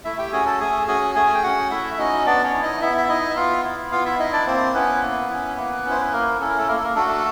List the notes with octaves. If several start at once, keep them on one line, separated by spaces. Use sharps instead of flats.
A3 E4 E5
G4 G5
C#4 F#4 G#4 G#5
A4 A5
A3 G#4 G#5
C#4 F#4 G#4 G#5
A3 G#4 G#5
G5
C#4 F#4 F#5
A3 E4 E5
E5
C#4 D#4 F#4 D#5
B3 D4 D5
C#4 C#5
E4
D#4 D#5
B3 E4 E5
E5
D#4 E4 D#5
E5
B3 F4 F5
E4
B3 F4 F5
E4 E5
D#4 E4 D#5
D4 D5
A#3 C4 C5
B3 C#4 E4 B4
A#3
C#4 E4
A#3
C#4 E4 C5
B4
A#3 A#4
C#4 E4 A4
A#4
A3 A4
A#3 A#4
A4
A#3 A#4
A3 D4 F#4 A4